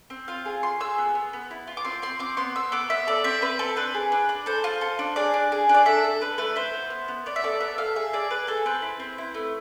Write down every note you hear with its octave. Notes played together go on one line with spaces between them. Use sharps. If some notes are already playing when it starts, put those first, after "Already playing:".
C4
F4 F5
G#4
F4 C6
G#4 E6
B3
B3
B3
E4
F4
D6
C4 C6
C4 C6
C4 D6
B3 C6
B3 E6
B3 D6
B3 E5
A4 D5
C4 E5
C4 B4
C4 A4
D4 B4
G#4
D4
D4
A4 C5
F4
A4
D4
G#4 D5
D4
G#4
D4
D5
A4 E5
A4
D4 B4
A3 B4
E4 C5
B3
B3
B3
B3 D5
E5
A4 D5
B3 E5
A4 F5
G#4 E5
G#4 D5
G#4 B4
G#4 A4
C4 B4
E4
C4
E4
A3